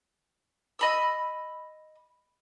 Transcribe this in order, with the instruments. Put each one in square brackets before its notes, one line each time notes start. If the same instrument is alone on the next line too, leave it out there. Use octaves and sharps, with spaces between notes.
[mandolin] D#5 B5 E6